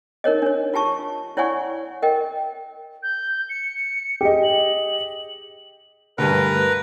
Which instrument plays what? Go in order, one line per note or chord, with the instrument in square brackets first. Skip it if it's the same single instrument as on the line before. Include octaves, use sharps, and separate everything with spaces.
[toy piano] D#4 A#4 C#5 D#5
D4 C#5
F4 G4 A5 C#6
E4 C#5 D5 F#5 G#5 C#6
A#4 D#5 G5
[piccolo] G6
C#7
[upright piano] G4 G#4 D#5
[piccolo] F#7
[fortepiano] D2 G2 [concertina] A#4 B4